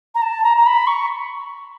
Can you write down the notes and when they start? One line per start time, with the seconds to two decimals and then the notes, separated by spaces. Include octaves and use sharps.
0.14 A#5
0.22 A5
0.43 A#5
0.57 A#5
0.66 B5
0.87 C#6